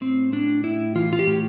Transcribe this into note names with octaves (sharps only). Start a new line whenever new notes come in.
A2 C4
A2 D4
A2 E4
E3 F4
F4
G4
A2